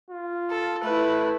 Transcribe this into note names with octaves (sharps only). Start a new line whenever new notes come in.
F4
A4
A3 E4 B4